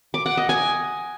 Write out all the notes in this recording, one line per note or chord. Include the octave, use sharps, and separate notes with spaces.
D6
F#5
D#5
G#5